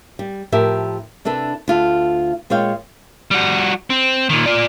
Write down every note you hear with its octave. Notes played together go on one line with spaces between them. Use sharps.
G3
A2 F3 G4 A#4 E5
C3 D4 E4 A4 B4
D2 F4 A4
A#2 G#3 F4 C#5 F5 G5
G3 F#4
C4
A#2 D#3
F4 D5